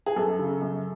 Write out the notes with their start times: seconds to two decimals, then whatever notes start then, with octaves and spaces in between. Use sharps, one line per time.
0.06 G#4
0.16 F#2 A4
0.39 C#3
0.62 F#2